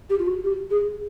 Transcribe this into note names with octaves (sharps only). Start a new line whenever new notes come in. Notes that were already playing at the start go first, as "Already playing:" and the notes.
G4
F4
F#4
G4
G#4